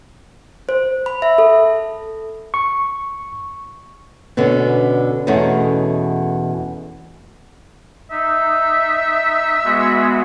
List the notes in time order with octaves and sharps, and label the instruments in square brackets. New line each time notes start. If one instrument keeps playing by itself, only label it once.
[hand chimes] C5
B5
E5
A4
[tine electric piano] C#6
[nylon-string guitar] B2 D3 B3 C#4
E2 B2 A3 C#4 D#4
[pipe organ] D#4 [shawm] E5
[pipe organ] G#3 B3 F#4